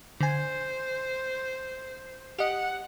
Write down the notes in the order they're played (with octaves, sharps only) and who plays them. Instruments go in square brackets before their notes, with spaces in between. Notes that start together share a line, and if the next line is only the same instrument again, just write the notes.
[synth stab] D3 G#5 [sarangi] C5
[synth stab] G4 D#5 [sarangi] F#5